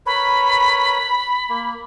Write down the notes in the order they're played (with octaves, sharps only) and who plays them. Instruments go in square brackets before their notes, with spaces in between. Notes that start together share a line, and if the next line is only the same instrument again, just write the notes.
[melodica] A#4 B4 C#5 [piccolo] B5
[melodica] A#3